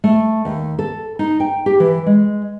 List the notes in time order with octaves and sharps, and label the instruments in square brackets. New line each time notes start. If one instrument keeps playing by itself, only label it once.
[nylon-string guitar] A3
D#2
A4
D#4
G5
G4
E3
G#3